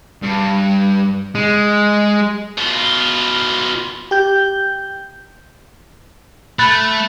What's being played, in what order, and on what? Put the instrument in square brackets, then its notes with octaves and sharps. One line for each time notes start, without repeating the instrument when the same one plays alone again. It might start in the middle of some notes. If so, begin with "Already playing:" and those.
[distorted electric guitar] G2
G#3
B2 F4
[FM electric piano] G4 G6
[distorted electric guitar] A3 [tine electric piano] B5 F#6 A6